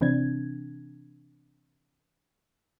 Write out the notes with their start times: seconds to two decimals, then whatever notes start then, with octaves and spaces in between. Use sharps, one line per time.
0.01 C3 E3 C4 D4 G#6